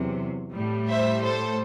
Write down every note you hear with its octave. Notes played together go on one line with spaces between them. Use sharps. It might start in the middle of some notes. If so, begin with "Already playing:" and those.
Already playing: E2 C3 F#3
A2 G3
C5 E5
A4 C5